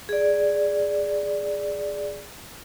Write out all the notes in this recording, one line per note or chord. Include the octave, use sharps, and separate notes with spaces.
G#4 D5